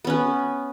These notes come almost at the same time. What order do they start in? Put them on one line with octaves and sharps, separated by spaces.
B3 C#4 B4